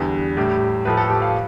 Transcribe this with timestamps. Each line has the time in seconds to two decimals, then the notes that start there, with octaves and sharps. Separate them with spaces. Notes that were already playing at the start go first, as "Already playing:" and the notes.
Already playing: E2 D3 G3 B4
0.37 A2 G3 G4
0.85 A2 F3 A3 B4
0.97 A4
1.10 G4
1.22 F5